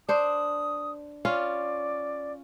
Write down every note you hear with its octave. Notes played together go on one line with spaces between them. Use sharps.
D4 C5 D#6
C#4 F4 D5 F5